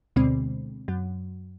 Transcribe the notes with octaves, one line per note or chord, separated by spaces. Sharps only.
D2 B2 D3 G#3 C4
F#2 F#3